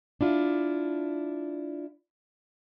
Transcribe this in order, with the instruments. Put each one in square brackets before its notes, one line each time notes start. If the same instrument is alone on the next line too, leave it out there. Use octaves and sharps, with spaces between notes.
[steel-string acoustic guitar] D4 E4 F4